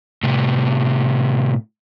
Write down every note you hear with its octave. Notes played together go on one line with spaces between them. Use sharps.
A2 C3